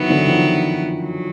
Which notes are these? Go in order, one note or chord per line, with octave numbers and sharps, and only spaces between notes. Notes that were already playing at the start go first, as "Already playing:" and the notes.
Already playing: D#3 F#3 B3 E4
D3 E3
D#3 F3
F#3